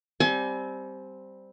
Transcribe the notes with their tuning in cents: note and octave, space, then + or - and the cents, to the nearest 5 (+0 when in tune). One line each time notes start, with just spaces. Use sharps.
G3 +0 C4 +0 G#5 +35